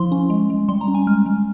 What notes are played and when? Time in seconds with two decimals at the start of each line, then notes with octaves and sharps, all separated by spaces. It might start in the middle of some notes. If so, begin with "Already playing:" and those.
Already playing: F3 E4 C6
0.12 C#4
0.30 G#3
0.50 G#3
0.68 G3 C6
0.81 A#5
0.88 C#4
0.95 G#5
1.07 G#3 F6
1.26 G#3